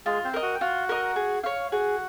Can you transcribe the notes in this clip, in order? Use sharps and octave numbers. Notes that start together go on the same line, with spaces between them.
G#3 F4 G#4
C4 C5
A#4 D#5
F#4 F#5
G5
F4 F#4 F#5
A#4 D#5
G#4
C#5 F5
F#4 G#4 F#5